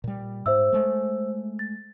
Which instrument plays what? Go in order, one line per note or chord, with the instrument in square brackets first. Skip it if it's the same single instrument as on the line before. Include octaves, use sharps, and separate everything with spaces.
[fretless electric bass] A#2 G3
[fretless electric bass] G#2 [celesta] C5 E5 E6
[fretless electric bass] G#3 A3
[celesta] A6